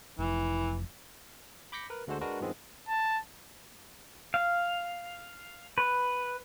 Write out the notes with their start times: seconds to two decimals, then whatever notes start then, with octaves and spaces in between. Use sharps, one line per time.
0.19 F1 E3
1.72 B5 D6 G6 A#6 B6 C#7
1.90 A#4 B4
2.07 D2 D3 G#3 F#4 A4 C5
2.21 G#3 D4 F#4 A#4 B4
2.41 G2 D#3 F3 G#3 B3 C4
2.88 A5
4.34 F5
5.78 B4